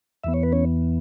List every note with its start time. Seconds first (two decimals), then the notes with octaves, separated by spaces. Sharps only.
0.24 E2 E3 B3 E5
0.34 C#5
0.43 B4
0.52 C#4 C#5